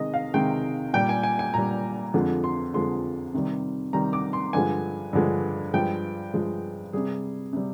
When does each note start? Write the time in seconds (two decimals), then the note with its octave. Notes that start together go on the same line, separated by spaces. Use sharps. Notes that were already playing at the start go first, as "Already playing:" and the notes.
Already playing: C3 D#3 G#3 D#5
0.14 F5
0.34 C3 D#3 G#3 G5
0.94 A#2 G3 G5
1.09 G#5
1.23 G#5
1.39 G#5
1.54 A#2 G3 A#5
2.14 F2 D3 F3 G#3
2.44 C6
2.74 F2 D3 F3 G#3 C6
3.34 C3 D#3 G3
3.93 C3 D#3 G3 A#5
4.13 D6
4.33 C6
4.53 G2 D3 F3 G#3 G#5
5.13 G2 D3 F3 G#3
5.74 G2 F3 G#3 G5
6.34 G2 F3 G#3
6.93 C3 G3 G#4
7.53 C3 G3